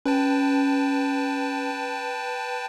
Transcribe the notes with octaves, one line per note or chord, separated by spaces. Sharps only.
C#4 B4 G5 A5